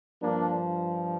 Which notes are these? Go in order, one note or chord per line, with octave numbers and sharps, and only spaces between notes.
G2 F3 A#3 D4